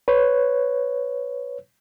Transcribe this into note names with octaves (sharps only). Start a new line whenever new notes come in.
B4 C#5